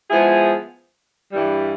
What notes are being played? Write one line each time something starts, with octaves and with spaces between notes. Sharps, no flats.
F3 G#3 B3 E4 G#4
G2 E3 G3